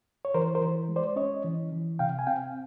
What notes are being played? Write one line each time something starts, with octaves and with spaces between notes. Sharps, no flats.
C#5
E3 A#4 C5
A#4 C5
E3
G#3
C5 D5
C#4 C#5 D#5
E3
E3
C3 F5 G5
G#5
C4 F5 G5